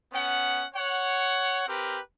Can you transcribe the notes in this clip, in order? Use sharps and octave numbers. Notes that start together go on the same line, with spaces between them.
B3 C#4 F#5
C#5 F#5
C4 G4 A#4 B4